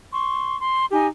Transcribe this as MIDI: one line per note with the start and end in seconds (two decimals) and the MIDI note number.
0.13 0.58 84
0.13 0.58 85
0.60 0.85 84
0.91 1.08 63
0.91 1.08 67
0.91 1.08 80